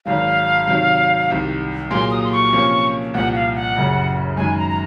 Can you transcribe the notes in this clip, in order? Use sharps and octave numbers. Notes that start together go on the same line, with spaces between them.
G#1 G#2 F#3 F5
C3 D#3 F#3
C2 C3 D#3
A#2 F#3 A#3 F4 G#4 C6
D#6
C6
C#6
C3 F3 A#3 C#4
C2 A#2 F3 F#5
F5
F#5
F#1 F#2 C#3
F#2 D#3 G#3 G#5
A#5
A#5